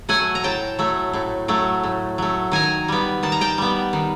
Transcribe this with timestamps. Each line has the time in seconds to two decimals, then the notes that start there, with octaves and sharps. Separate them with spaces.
0.09 F#3 A3 F#5 G#5
0.35 A#5
0.44 A2 G5 A5
0.79 F#3 A3
1.13 A2
1.48 F#3 A3
1.83 A2
2.18 F#3 A3
2.52 D#3 G#5 A#5
2.88 G3 B3
3.23 D#3 A5
3.32 A#5
3.41 G5 A5
3.58 G3 B3
3.93 D#3